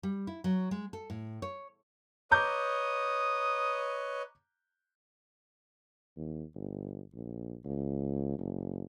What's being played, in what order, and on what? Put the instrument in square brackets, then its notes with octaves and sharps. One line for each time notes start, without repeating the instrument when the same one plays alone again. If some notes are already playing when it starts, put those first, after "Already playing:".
[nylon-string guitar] G3
E4
F#3
G#3
A4
A2
C#5
[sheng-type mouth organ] B4 C#5 D#5 [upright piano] A#5 D6 G6 [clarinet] D#6
[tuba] D#2
G1
A#1
C#2
F#1